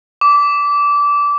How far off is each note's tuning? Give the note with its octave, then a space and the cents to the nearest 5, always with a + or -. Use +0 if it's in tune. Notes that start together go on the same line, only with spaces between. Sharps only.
D6 -20